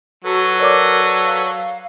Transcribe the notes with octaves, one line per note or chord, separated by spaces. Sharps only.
F#3 F#4 A4 B4
A#4 C#5 D5 D6
F5